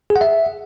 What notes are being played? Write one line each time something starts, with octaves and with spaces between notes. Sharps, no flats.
G#4
F#5
E5